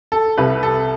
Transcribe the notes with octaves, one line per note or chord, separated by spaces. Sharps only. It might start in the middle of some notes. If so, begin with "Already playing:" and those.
A4
C2 C3 G3 B4
A4